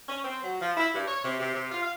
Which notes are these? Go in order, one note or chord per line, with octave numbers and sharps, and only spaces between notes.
C#4
C4
F#3
F3
E4
G2
C#5
C3
C3
C3
F4
F5